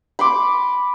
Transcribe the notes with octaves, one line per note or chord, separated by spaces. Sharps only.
B5 C6 D6